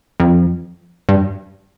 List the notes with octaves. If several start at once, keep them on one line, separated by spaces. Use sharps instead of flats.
F2
G2